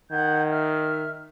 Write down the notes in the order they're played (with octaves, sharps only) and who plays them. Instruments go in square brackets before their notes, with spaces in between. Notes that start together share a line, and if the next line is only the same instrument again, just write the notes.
[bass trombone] D#3 [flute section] F#5 G6 G#6
[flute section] E5 F6